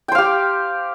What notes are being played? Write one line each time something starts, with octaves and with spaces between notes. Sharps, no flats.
G4 C5 F5 G5